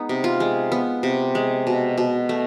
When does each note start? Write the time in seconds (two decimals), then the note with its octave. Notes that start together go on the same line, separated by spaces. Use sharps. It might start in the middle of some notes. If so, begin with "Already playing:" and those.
Already playing: G#3 B3 D#4
0.09 C3
0.24 F4
0.40 G#3
0.72 B3
1.03 C3
1.35 G#3
1.67 B2
1.98 B2
2.29 A3